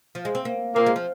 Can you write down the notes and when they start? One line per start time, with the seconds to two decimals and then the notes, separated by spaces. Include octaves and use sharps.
0.15 F3
0.25 G#3
0.35 C4
0.45 A#3
0.75 A#2 A#3 C4
0.86 G#3
0.96 F3